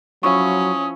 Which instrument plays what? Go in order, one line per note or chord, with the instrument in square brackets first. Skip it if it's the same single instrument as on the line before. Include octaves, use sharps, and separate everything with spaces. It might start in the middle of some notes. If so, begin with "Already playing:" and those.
[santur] F3 E4 C#6 [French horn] F#3 [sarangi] C#4 [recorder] D#6